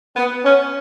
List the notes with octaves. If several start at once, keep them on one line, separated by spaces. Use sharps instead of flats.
B3
C#4